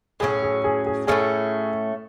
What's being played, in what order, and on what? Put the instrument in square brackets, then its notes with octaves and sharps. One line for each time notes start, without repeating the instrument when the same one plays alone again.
[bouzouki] A2 F#3 A3 C#4 [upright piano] G#4
[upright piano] G#4
G#4
G#4
[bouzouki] A2 F#3 A3 C#4 [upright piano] G#4